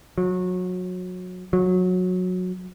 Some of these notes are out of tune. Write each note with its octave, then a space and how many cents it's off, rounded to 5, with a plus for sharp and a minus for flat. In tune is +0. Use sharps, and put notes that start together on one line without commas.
F#3 -25
F#3 -20